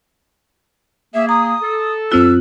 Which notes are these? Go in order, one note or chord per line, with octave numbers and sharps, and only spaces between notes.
A#3 G#4 E5
A#5 D#6
A4
F#2 C4 F4 E6 F#6